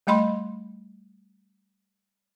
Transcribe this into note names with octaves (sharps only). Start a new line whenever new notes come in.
G3 A3 D#5 B5 C6